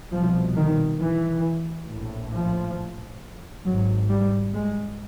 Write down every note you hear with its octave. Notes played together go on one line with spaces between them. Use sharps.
C2 B2 F3
D#3
E3
A#1 A2
F3
G#1 G#2 F#3
G3
G#3